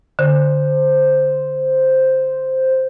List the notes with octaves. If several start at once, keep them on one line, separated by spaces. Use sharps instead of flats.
D3 C5